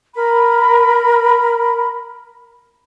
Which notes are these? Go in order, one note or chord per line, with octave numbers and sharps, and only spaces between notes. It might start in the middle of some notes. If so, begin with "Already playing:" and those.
A#4 B5